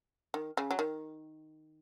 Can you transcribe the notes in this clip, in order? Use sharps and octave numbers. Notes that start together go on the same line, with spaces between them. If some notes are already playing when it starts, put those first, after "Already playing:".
D#3
C#3
F#3
D#3